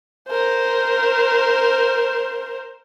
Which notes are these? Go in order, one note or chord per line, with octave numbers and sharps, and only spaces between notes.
A#4 C5